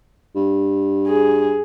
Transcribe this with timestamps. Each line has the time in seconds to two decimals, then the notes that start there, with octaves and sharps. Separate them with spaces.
0.35 G2
1.07 G#4